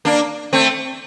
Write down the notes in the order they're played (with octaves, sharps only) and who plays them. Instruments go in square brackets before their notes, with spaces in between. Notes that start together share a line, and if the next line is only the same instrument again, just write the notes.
[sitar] A#3 D4
A3 C4